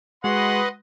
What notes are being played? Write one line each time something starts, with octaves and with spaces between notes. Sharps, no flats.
G#3 F#4 B4 D#5 F#5 C6